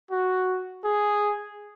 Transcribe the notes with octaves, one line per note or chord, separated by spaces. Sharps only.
F#4
G#4